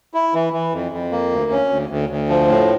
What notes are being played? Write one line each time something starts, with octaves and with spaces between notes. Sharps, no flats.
E4
E3
E3
F2
F2
A#3
D2
C#4
D2
D2
D2
F3
A2